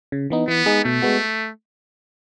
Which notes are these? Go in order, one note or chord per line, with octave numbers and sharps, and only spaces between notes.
C#3
E3 B3 D#4
E3 B3
G#3 D#4 G#4
B2 A3
G#3 B3 F#4